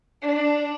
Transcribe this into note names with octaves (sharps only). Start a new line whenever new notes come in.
D4